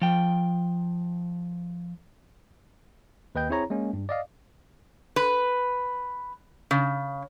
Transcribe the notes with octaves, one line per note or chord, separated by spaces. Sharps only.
F3 G5
D#2 B4 D#5 G5 G6
C4 E4 G#4 C#5 A#5
G#3 A#3 C#4
G2
D5 D#5 F5
B4
C#3